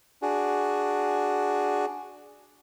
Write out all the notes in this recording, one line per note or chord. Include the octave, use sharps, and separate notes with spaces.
D4 F#4 G#4